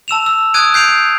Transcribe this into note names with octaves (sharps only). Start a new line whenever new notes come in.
A5 E6 E7 F7
E6
D#6 F#6 G#6 D7 D#7
G6 C7 D7 F7